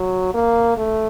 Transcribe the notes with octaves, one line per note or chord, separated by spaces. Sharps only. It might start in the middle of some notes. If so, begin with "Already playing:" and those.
Already playing: F#3
A#3
A3